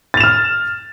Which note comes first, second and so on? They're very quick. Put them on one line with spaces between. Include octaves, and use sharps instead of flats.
A6 F7 E7 F6